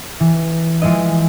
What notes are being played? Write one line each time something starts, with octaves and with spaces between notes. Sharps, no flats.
E3
E3 F3 G#3 E4 D#5